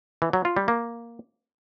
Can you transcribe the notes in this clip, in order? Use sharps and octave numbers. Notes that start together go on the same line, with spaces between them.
E3
F#3
F4
G3
A#3